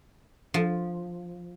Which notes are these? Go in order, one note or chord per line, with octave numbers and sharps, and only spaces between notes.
F3